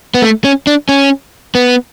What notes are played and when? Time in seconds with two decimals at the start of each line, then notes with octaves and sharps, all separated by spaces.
0.14 B3
0.22 A3
0.44 C#4
0.67 D4
0.89 C#4
1.55 B3